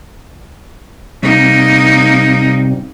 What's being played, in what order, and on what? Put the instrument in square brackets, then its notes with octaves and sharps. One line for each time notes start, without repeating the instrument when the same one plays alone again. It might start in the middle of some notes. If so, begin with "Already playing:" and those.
[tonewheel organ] C3 G3 C4 [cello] A#3 D#4